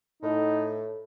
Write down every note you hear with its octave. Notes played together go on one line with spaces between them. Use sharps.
A2 D#4